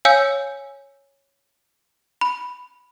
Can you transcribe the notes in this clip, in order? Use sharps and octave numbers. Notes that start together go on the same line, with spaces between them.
C#5 F5 G#5 E6 G6 C#7
B5